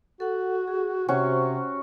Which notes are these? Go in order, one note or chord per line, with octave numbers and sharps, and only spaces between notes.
F#4 A4 F#5
G#4
C3 C#4 F#4 C5